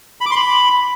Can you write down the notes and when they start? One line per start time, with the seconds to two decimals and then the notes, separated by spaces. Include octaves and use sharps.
0.21 B5
0.26 D6
0.31 C6
0.36 B5